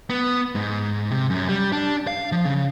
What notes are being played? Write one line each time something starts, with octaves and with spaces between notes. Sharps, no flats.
B3
G#2
C3
F#2
G3
D4
F5
F3
C#3